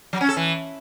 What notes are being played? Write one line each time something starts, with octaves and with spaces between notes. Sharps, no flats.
F#3
C#4
A4
E3